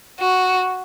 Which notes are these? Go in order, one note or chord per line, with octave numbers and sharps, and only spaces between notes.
F#4